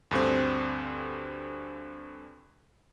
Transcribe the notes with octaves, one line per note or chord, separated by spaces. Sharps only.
D2 G2 D3 C4